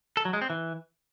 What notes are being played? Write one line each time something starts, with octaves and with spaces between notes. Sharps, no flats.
A4
F#3
G#3
C4
E3